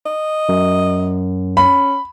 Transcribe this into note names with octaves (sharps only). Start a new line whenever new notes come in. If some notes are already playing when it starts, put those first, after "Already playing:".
D#5
F#2
C#4 B5